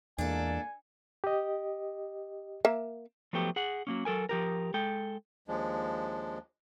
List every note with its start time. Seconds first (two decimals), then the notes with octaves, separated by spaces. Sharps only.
0.18 E2 A#2 G#3 A#3 D4 A4 G#5
1.24 G4 D#5
2.65 A#3 E5
3.33 F3 F#3 A3 B3 G4 A4
3.56 G#4 F#5
3.87 F#3 A#3 C#4
4.05 F#3 A4 A#4 G#5
4.29 F3 G4 A#4
4.74 G#3 A4 G5
5.48 D#2 F3 G#3 D4